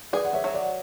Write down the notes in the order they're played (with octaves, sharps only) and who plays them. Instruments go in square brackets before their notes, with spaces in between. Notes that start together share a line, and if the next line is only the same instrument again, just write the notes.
[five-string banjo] G#4 [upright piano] B4 D5
[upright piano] F#5
C#5 E5
[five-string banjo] F#3
[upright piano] D5 F#5